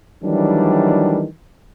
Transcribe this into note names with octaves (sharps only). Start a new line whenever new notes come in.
D#3 E3 F#3 G3 A3 D4